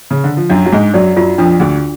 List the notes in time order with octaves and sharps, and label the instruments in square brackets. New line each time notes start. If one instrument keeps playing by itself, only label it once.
[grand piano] C#3
D3
F3
[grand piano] F#2 F#3 [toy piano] D4
[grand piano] F#3
[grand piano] G#2 G#3 [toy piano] G#4
[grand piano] F#2 F#3 [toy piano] D5
[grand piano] F#2 F#3 [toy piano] F4
[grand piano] F2 F3 [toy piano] D4
[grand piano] D2 D3 [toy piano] G#4